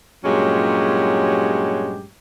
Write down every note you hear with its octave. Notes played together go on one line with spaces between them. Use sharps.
G2 A#2 F#3 G#3 C#4 G4